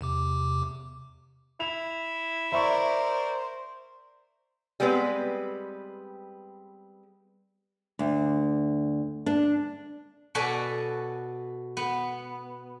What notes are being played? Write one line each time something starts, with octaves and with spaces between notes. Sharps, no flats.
E2 C3 D6
E4 F7
A#4 C5 D5 E5 B5 C#6
G3 G#3 B3 C4 B4
D2
D4
B2 F#4 A4 B4 D5 G#5
B3